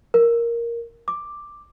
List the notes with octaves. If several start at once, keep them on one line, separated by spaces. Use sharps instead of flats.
A#4
D6